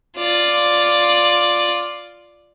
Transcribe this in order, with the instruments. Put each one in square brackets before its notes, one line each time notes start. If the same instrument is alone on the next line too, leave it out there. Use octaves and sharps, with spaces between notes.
[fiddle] F4 D5